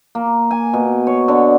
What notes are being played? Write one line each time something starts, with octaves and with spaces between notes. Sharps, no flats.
A#3
G#5
B2
C#5
D3